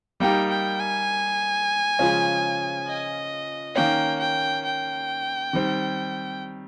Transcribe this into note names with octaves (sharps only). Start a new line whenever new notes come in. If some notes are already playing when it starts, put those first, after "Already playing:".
G3 A#3 D#4 G4 G5
G5
G#5
C#3 F3 G#3 C#4 F4
D#5
D#3 A#3 C#4 G5
G5
G5
D#3 G3 C4